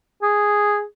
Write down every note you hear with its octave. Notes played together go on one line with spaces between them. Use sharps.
G#4